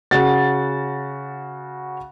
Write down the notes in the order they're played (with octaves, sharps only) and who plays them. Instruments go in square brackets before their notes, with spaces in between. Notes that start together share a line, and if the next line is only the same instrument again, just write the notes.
[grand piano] C#3 F#4 F#5 A6